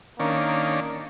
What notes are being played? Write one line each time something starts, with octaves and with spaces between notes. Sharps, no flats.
D#3 A#3 C#4 D4